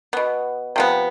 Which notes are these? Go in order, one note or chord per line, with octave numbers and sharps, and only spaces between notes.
B2 B3
C3 F3 B3